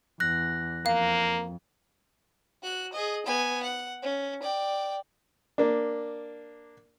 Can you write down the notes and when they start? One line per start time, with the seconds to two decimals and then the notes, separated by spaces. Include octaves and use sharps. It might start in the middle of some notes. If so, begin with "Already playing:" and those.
0.20 E2 F#6 A#6
0.86 F2 A#3 F5
2.63 F#4 F#6
2.93 G#4 D#5
3.26 B3 G#5
3.63 F#5
4.03 C#4
4.42 D5 G5
5.58 A#3 D4